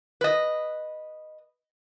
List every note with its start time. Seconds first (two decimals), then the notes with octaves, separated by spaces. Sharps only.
0.21 B4 D#5